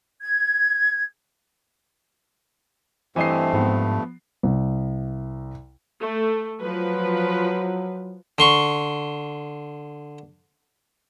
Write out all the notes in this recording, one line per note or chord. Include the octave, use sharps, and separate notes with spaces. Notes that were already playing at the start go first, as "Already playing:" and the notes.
G#6
G2 E3 A3 C4 D#5 C7
G#2 F3 B3
C2
A3
F3 F#3 B4
D3 C6 C#6